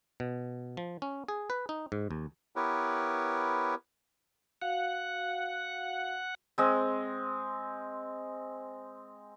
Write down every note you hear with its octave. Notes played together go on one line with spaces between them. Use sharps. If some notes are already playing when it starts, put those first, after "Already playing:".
B2
F3
C#4
G#4
B4
D#4
G#2
D#2
B3 E4 G4 A#4 B4 C#5
F#4 F5 F#5
G#3 C4